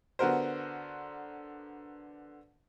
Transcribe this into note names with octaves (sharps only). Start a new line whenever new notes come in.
D3 B3 F#4 A#4 C5